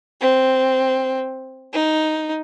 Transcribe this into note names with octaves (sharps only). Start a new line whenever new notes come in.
C4
D#4